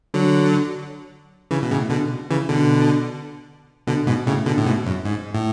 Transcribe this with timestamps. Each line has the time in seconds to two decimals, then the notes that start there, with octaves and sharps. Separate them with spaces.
0.14 D3 F#3
1.51 C#3 E3
1.62 B2
1.71 A2 C#3
1.90 B2 D3
2.31 C#3 E3
2.49 B2 D3
3.87 B2 D3
4.07 G#2 B2
4.27 A2 C#3
4.46 B2 D3
4.57 A2
4.66 G#2 B2
4.86 F#2
5.05 G#2
5.34 A2